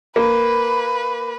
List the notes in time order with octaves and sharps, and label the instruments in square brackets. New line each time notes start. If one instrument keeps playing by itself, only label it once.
[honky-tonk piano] A#3 [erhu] B4